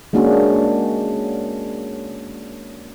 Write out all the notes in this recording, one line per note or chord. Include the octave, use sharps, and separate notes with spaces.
G#3 A#3 C#4 D4 F#4